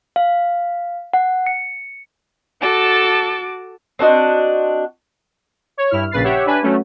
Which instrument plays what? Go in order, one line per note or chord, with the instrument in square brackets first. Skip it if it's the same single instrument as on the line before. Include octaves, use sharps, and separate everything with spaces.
[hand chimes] F5
F#5
C#7
[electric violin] F#4 D6 [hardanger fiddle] A4 A5
[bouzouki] C4 D4 F#4 D#5
[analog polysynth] C#5
G2 E4 F6
A#1 C#3 B4 A6 C7
G4 C#5 E5 F#5
D4 B4 G#5
F#3 A3 C#4